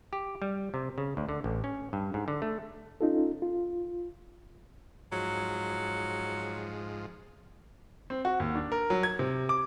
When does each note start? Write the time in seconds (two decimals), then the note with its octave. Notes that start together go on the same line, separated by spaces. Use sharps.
0.13 G4
0.42 G3
0.74 C3
0.98 C#3
1.17 D2
1.29 D3
1.44 A1
1.64 C#4
1.93 G2
2.14 G#2
2.28 D3
2.42 A3
3.01 C#4 D#4 F4 A4
3.42 F4
5.12 G#2 F3 F#3
8.10 C4
8.25 F#4
8.40 D#2
8.55 D4
8.72 A#4
8.90 F#3
9.03 G#6
9.19 C3
9.49 D6